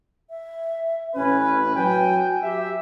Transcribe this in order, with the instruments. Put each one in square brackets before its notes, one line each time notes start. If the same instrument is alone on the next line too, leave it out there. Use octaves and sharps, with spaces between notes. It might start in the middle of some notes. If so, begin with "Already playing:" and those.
[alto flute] E5
[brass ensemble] A1 B4 [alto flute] C#4
[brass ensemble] F#3 G5 [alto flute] G#5
[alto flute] G4 [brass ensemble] E5